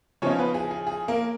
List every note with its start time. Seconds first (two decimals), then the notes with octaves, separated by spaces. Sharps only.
0.22 C#3 F3 B3 C#4 D#4 C#5
0.39 B3 B4
0.54 G#4
0.71 G#4
0.87 G#4
1.08 A#3 A#4